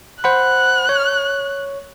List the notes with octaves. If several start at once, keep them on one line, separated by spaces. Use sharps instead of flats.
C5 F#5 B5 F#6
C#5